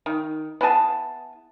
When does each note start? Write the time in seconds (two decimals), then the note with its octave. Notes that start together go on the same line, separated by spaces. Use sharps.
0.06 D#3
0.61 B3 E4 G#4 A5